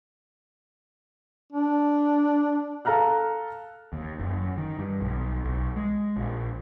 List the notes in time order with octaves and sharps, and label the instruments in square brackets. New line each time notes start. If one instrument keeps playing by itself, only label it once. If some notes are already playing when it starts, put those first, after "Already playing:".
[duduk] D4
[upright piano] A4 F5 A#5 F6 F#6
[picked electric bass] D#2
F#1
F#2
D#3
G2
B1
B1
G#3
A#1